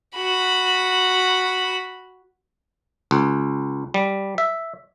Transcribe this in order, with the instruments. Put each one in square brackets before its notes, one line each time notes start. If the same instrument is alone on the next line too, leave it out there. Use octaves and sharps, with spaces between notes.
[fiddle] F#4 B5
[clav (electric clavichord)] C#2
G3
E5